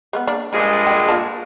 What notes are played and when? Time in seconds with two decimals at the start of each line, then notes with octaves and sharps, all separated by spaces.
0.13 G#3 A3 B3
0.27 A#3 D4
0.53 G2 A#2 F3 G#3
0.87 D3 G5
1.08 A#3 F4 A5